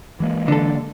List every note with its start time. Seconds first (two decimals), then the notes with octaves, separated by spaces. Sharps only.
0.20 E3 G#3 A#3
0.48 D3 A4